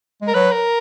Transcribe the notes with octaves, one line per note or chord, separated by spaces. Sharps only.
G#3
A#4
F#3 B4
A#4